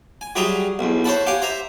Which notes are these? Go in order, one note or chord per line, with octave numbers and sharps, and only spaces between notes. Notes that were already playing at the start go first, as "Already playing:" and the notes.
G#5
F#3 G3 G#4 E5 A#5 C6
B1 E2
C5 C#5 E5 F#5 A5 B5
G4 F5 F#5 G#5
C5 E5 A#5